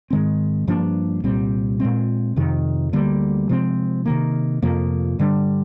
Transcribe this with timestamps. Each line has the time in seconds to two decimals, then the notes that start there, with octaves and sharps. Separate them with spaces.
0.10 G#2 D#3 G#3 C4
0.67 G2 F3 A#3 D4
1.24 C2 A#2 G3 C4
1.80 A#2 G#3 C4
2.36 F2 C3 D#3
2.93 D2 D3 G3 A#3
3.49 C3 F3 G#3 C4
4.06 C3 D#3 A#3
4.62 F2 C3 F3 A#3
5.19 G2 D3 G3 D4